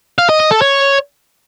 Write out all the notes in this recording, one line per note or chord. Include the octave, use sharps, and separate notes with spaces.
F5
D#5
D#5
A4
C#5